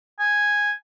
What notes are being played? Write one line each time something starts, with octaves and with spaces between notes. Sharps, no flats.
G#5